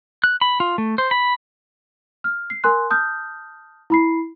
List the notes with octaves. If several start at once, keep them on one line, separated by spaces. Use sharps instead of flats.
F#6
B5
F4
A3
C5
B5
F6
C7
A#4 G#5 C6 F#6
A5 D#6 F6 G6
E4 B5 C7